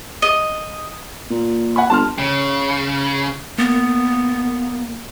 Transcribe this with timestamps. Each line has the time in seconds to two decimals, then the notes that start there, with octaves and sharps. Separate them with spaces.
0.22 D#5
1.30 A#2
1.76 F#5 G#5 B5
1.90 G1 A5 C6 F6
2.18 C#3
3.58 A#3 B3